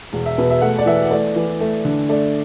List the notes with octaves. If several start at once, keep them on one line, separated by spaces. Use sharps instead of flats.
E1
E5
B2 B4
E5
A3 F#5
D5
E3 E5
A3 D5
E3
A3
D3
A3 D5